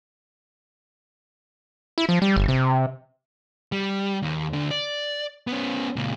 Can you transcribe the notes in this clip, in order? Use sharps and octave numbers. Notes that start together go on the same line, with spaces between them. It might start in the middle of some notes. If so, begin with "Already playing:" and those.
E4
F3
G3
G1
C3
G3
D#2
D2 D4
D5
B3 C#4
C#2 A#2